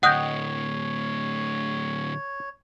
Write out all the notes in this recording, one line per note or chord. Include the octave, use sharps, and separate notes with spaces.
D2 A2 C#5 D#5 F#5 G5 D#6 F#6